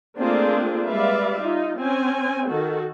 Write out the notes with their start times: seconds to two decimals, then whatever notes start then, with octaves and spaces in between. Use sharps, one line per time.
0.18 A3 A#3 C4 D4 F4 G#4
0.88 G3 G#3 B4 D5 E5 F5
1.39 D#4 F4
1.78 C4 C#4 G#5
2.50 D#3 F#4 A4